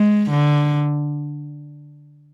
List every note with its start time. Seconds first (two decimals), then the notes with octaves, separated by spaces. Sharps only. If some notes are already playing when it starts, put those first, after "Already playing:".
Already playing: G#3
0.31 D3